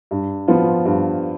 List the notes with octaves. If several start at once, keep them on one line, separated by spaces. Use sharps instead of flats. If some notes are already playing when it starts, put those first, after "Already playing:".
G2
F3 B3 F4
G2